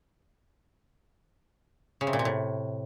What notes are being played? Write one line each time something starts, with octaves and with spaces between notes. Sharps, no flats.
C#3
C3
A#2
C3
A2